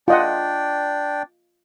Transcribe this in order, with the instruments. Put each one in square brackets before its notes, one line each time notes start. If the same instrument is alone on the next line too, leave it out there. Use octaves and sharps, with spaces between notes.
[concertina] D4 D5 G5 [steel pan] F4 D#5 F#5